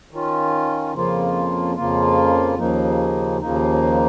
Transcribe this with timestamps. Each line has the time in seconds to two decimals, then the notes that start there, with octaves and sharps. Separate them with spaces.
0.11 D#3 C#4 F4
0.94 F2 C#3 F3 A#3 F4
1.76 F2 C#3 F3 A#3 F4
2.59 D#2 C#3 F3 A#3 D#4
3.41 D#2 C#3 F3 A#3 D#4